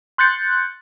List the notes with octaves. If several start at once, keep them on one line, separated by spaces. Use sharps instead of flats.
C6 F#6 G6 A6 C#7